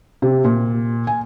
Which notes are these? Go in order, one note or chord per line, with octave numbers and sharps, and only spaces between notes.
C3
A#2
G#5